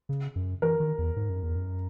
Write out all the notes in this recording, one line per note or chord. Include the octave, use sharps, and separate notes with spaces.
C#3
F#2
E3 A#4
D#3
E2
G#2
F#2
E2
F#2